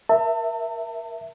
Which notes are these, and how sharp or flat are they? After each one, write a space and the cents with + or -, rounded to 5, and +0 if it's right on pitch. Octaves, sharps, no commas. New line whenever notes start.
A#4 +25 E5 +0 A5 +40